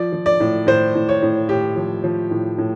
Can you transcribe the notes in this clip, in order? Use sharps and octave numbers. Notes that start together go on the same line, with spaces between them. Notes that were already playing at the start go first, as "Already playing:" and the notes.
Already playing: F3 D5
F3
D5
A2
A2 C5
A2
C#5
A2
A2 G4
F3
F3
A2
A2